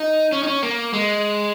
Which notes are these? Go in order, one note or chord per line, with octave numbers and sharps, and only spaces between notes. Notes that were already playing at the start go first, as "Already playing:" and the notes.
Already playing: D#4
C#4
D#4
C#4
A#3
G#3